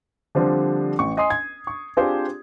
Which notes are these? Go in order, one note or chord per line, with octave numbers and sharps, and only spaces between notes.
D3 F3 G3 C4 D4
A1 C#6
D#5 G#5 C6 D#6 C7
G#6
C#6
C4 D4 F4 G4 G#4 C5